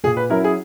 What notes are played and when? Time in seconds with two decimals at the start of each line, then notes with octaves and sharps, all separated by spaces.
0.04 A#2 G#4
0.17 B4
0.30 F#3 C#4 E4 A#4
0.44 G#4